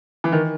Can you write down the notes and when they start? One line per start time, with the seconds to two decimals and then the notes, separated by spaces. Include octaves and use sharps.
0.24 E3
0.32 D#3